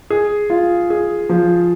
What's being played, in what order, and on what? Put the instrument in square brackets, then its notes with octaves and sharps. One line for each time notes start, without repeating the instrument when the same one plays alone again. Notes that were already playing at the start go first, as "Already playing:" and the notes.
[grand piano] G#4
F4
G#4
F3